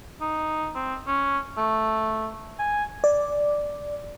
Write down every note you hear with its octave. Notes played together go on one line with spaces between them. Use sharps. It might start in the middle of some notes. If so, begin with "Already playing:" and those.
D#4
C4
C#4
A3
G#5
D5